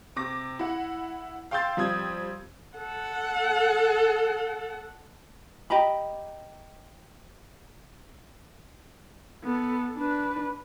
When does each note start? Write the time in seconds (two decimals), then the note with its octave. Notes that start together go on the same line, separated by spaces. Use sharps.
0.16 C3 D6 A#6
0.59 E4 F#5
1.51 F5 G5 C6 E6 G6 A6
1.77 F3 G3 C4 D#6 G#6
2.78 A4 F#5
5.70 G4 D#5 A#5 B5
9.44 B3 A4
9.96 D4 B4